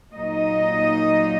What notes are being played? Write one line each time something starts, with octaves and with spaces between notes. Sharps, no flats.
A#2 F#3 A#3 D#4 D#5